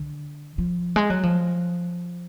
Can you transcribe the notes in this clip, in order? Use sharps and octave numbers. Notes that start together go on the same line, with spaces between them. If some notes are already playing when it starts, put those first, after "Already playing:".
Already playing: D3
F3
G#3
F#3
F3